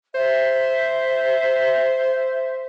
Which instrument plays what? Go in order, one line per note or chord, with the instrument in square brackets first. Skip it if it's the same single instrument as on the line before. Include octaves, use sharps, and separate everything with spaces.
[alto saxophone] C5 [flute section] E5